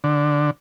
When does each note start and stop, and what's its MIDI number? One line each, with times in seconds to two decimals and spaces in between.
0.04 0.50 50